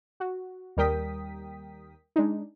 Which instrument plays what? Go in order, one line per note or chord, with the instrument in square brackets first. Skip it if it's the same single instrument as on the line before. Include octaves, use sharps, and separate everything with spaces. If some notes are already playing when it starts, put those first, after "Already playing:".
[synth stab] F#4
D#2 G3 A#4 G5 D#6 B6
G#3 D4 D#4